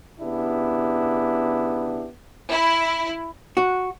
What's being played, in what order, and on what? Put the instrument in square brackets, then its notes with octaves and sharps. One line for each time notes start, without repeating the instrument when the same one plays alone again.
[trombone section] C#3 B3 D4 E4 G4
[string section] E4
[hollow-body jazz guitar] F#4